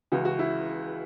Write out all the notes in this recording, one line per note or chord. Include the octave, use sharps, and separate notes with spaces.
C#2 C#3 E3 F#4
F#4
E4